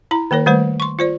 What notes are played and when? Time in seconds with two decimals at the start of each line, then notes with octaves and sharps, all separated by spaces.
0.11 E4 A#5
0.31 D#3 A#3 A#4 C#5
0.46 D#3 G3 A3 B4 C5
0.80 C6 C#6
0.99 F4 C5 D5